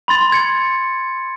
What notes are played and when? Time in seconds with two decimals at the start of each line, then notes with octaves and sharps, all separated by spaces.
0.08 B5 C6 A6
0.32 G#6 C#7